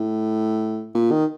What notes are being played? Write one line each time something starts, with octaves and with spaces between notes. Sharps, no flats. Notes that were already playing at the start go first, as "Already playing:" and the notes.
Already playing: A2
A#2
D#3